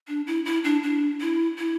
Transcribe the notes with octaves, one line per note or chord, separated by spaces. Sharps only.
D4
E4
E4
D4
D4
E4
E4